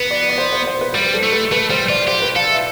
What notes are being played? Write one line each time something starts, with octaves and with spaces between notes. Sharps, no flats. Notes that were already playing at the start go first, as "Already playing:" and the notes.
Already playing: B3 B4
D5
D5
C5
C5
C5
B4
G3 C5
A4
A3
B4
A3 B4
G3 C5
F4 D5
G4 C5
B4
A4 F5
E5